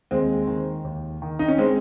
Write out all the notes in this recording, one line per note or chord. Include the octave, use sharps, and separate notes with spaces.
D#2 G#3 C4
D#3
D#2
D#3
D#4
C#4
G#3 C4